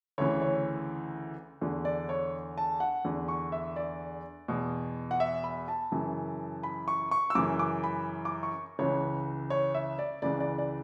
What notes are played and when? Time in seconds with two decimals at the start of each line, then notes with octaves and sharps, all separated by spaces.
0.18 D2 C#3 E3 C#5
0.41 C#5
1.62 E2 D3
1.85 D5
2.09 C#5
2.58 A5
2.80 F#5
3.05 E2 D3
3.28 C#6
3.52 E5
3.76 D5
4.48 E2 B2
5.11 F#5
5.20 E5
5.44 B5
5.68 A5
5.92 F#2 C#3 E3
6.63 B5
6.88 C#6
7.11 C#6
7.30 E6
7.35 F#2 C#3 E3 D6
7.59 D6
7.84 B5
8.25 D6
8.43 C#6
8.79 C#2 C#3 E3 C#5
9.50 C#5
9.74 E5
9.99 D5
10.22 C#2 C#3 E3 D5
10.40 D5
10.58 D5